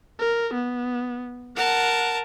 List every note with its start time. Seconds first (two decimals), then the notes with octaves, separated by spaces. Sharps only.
0.19 A#4
0.53 B3
1.56 A#4 F#5 A5